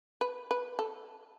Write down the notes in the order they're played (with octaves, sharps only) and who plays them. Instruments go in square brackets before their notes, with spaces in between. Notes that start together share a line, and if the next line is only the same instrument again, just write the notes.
[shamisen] B4
B4
A4